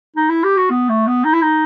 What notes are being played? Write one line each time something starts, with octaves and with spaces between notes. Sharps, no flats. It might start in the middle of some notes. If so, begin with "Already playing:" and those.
D#4
E4
G4
F#4
B3
A3
B3
D#4
E4
D#4